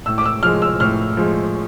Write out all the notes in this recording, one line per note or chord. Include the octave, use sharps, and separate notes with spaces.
A2 E6
D6
E6
F3 G#3 F6
E6
A2 F6
F3 G#3